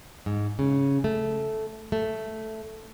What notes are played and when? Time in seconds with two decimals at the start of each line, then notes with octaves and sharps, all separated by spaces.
0.26 G#2
0.59 C#3
1.04 A3
1.92 A3